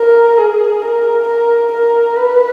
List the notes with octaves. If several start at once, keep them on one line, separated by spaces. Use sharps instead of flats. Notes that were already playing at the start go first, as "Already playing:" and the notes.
Already playing: A#4
G#4
A#4
A#4
A#4
B4